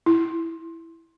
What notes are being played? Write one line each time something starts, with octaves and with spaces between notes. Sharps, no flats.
E4